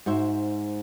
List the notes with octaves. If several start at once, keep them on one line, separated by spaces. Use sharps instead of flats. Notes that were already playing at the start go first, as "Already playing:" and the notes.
G#2 F#4 C5 E5